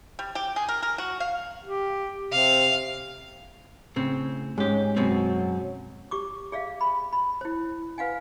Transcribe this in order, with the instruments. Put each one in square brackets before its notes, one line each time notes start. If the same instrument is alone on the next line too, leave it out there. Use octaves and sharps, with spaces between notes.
[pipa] G3
G4
G#4
A#4
A#4
F#4
F5
[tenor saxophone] G4
[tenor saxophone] C3 [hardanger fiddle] F5
[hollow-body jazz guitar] A2 C#3 C4
[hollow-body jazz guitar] G#2 G4 [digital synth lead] G#3 [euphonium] C#4
[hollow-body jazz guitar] F#2 B2 C4 [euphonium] F#3
[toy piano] G4 C#6 D6
G#4 D5 E5 F5
B5
B5
E4 C5
B4 F5 F#5 G#5